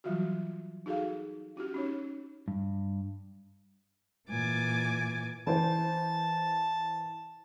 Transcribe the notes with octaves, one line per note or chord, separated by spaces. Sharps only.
E3 F#3 G3 F4 F#4
D#4 F#4 G#4 A4 F5
C#4 E4 F#4 G4
C#4 D#4 C#5
G2
A#2 E3 G#5 D6 A6
E3 C5 A5